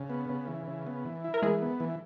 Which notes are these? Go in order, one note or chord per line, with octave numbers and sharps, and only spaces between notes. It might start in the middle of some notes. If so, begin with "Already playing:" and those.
Already playing: C#3
B3
C#3
E3
C#3
B3
E3
E4
A#4
E3 G#3 G#4
B3
E3